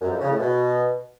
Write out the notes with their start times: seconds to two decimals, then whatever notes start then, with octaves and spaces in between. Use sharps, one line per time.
0.01 F#2
0.11 F2
0.20 C#3
0.30 A2
0.40 B2